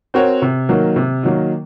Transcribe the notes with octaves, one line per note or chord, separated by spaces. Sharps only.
C4 F#4 A#4 C#5
C3
D#3 F#3 A#3
C3
D#3 F#3 A#3